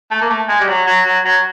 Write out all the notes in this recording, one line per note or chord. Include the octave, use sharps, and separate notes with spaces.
A3
A#3
A3
G#3
G3
F#3
F#3
F#3
F#3